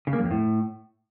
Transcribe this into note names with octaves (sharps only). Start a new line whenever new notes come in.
C#3
A#3
F#2
F2
A2